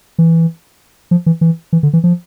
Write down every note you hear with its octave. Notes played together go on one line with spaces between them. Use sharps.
E3
F3
E3
E3
E3
D3
E3
F3